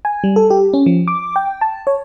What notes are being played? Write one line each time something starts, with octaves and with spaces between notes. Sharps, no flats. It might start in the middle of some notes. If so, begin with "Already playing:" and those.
G#5
G3
A4
G4
C#4
F3
D6
G5
A5
C#5